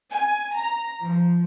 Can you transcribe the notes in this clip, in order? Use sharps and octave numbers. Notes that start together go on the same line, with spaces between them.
G#5
A#5
F3